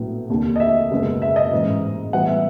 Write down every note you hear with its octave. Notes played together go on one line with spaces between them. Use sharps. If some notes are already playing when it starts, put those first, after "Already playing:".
Already playing: A#1 A2 F#3 B3 E4
F1 D#2 D3
D#5
E5
F#1 E2 B2 G#3 B3
E5
D#5
A1 G#2 E3 G#3
A2 E3 G3 B3 F#5
E5